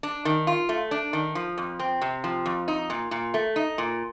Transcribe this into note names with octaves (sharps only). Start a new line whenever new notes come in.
D4
D#3
F4
A3
D4
D#3
F3
F2
C4
C3
F3
F2
D#4
A#2
A#2
A3
D#4
A#2